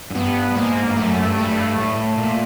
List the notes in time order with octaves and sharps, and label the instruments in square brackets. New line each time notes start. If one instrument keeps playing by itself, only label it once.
[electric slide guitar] F#2
[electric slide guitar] G2 [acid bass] B3
[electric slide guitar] G2
[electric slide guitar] G#2 [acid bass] A#3
[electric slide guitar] G2
[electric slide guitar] F#2 [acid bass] A3
[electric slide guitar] G2
[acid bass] A3
[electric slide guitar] G2
A2
A#2